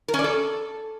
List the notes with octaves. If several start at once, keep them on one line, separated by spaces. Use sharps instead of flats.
A#4
C#4
D5
A4